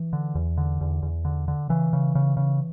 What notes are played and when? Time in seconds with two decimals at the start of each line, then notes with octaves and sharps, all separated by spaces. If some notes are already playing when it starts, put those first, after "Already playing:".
Already playing: E3
0.13 D3
0.35 E2
0.58 D3
0.81 E2
1.03 E2
1.25 D3
1.48 D3
1.69 C#3 E3
1.93 C#3
2.15 C#3
2.37 C#3